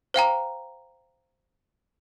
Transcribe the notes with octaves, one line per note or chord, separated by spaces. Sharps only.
C5 F5 G5 A#5